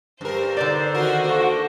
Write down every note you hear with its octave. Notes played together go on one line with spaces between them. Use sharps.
G2 A#4 C5
D3 D#4 D5
D#3 F#4 A#4
A#3 A4 C5